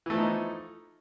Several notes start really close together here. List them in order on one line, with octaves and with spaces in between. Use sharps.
E3 A3 F3 D#4